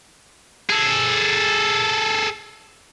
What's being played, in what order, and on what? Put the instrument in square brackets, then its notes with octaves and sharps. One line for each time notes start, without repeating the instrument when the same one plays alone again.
[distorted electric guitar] G#4 A4